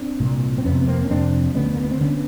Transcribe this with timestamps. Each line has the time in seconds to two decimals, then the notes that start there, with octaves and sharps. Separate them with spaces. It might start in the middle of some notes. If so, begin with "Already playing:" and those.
Already playing: C4 D4
0.20 C2 A#2
0.58 C4
0.64 F2 C3 B3 C#4
0.81 B3
0.88 A#3 C4
1.05 C#4
1.10 F2 C3 C4 D4
1.55 D2 D3 B3 C#4
1.74 A#3
1.83 B3
1.91 C4
2.01 D3 B3 C#4